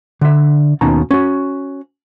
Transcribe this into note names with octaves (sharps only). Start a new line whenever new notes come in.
D3 E5
D#2 B2 C#4 D#4 A5 A#5
C#4 F#4